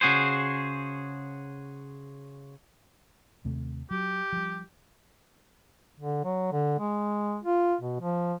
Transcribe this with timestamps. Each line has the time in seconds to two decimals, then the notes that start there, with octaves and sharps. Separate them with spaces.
0.01 C#3 F#4 G#4 C5
3.45 D#2 C3 A3
3.91 F#3 G4
4.32 F3 G3
6.00 D3
6.24 F#3
6.52 D3
6.79 G#3
7.43 F4
7.81 B2
8.00 F3